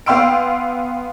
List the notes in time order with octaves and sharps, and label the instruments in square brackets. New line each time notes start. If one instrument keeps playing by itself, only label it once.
[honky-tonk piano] B3 F5 G5 C6 E6 D7